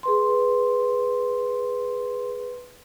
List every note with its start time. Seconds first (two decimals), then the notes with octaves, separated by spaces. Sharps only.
0.03 G#4 B4 C6